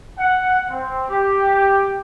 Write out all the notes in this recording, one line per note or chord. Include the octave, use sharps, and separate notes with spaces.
F#5
C4
G4